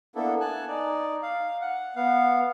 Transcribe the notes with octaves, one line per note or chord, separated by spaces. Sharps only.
A#3 B3 D4 E4 A4
G#5 A5 F#6
D#4 D5
F5
F#5
B3 F5